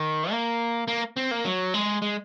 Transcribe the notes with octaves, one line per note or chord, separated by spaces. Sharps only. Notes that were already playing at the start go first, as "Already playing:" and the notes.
Already playing: D#3
A#3
A#3
C4
A#3
F#3
G#3
G#3